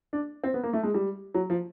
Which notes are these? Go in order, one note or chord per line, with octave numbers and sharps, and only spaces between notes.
D4
C4
B3
A#3
A3
G#3
G3
F#3
F3